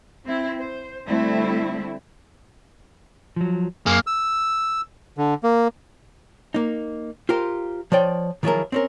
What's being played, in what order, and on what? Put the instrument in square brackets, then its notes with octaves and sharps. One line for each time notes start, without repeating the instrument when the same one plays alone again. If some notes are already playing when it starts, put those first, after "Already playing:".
[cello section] C4 E4
C5
D3 G3 A3 C4 E4
[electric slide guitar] F3 F#3
[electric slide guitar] F#2 [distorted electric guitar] A#3 G#4
[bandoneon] E6
D3
A#3
[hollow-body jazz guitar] A#3 D#4
F4 G4 A#4 C5
F3 C#5 D5 G5
D#3 F3 F#3 E4 G#4 A#4
C4 C#4 A#4